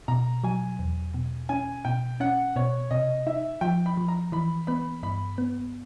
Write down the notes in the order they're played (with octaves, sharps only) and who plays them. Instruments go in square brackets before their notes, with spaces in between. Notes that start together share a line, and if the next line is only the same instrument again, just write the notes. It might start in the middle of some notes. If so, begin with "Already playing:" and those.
[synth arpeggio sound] B2 [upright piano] A#5
[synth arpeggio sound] F#3 [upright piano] G#5
[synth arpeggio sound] E2
B2
[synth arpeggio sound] C#4 [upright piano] G#5
[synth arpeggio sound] B2 [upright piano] G5
[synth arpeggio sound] C#4 [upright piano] F#5
[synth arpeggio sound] B2 [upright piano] C#5
[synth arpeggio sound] C3 [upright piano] D#5
[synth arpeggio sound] D#4 [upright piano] E5
[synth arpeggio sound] F3 [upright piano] G5
[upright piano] B5
[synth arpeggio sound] F3
[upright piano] A#5
[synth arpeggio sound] E3 [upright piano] B5
[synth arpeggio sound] B3 [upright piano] B5
[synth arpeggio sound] G2 [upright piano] B5
[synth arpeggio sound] B3